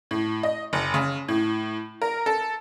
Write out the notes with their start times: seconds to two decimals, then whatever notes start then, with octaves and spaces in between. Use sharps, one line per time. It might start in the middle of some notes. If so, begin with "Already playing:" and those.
0.11 A2
0.43 D#5
0.73 F#1
0.94 C#3
1.28 A2
2.02 A#4
2.26 A4